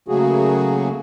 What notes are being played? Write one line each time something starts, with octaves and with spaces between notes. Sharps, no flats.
C#3 F#3 A3 A#3 F#4 G#4